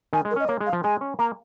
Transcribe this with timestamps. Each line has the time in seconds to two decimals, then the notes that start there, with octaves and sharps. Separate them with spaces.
0.13 D#3 G#5
0.25 G#3
0.31 A#4
0.36 C#4
0.40 D#5
0.48 A#3 C#5
0.60 G#3
0.66 F5
0.73 F3
0.84 G#3 G#5
1.01 C#4
1.19 A#3 A#5